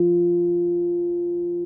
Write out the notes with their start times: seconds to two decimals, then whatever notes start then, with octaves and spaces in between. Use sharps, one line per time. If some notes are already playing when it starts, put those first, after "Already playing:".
Already playing: F3